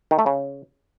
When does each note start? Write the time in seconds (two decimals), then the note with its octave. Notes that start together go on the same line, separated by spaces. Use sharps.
0.11 D#3
0.19 A3
0.26 C#3